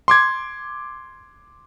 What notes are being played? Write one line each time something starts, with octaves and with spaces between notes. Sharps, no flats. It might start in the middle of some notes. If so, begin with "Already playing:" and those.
C6 D6 G#6